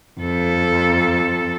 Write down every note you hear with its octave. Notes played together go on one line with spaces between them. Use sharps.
F2 A4